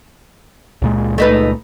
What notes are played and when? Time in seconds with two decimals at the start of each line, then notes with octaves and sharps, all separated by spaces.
0.82 C#2 A#2 G#3
1.18 A3 D#4 B4